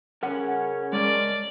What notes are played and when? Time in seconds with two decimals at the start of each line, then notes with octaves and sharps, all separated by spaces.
0.23 C#3 C#4 A#4 F#5
0.93 G#3 A#4 D5